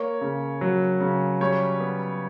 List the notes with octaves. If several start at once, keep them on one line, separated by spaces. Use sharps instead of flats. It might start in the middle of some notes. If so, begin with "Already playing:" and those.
Already playing: A#3 C#5
C#3
F#3
C#3
G3 C#5
B3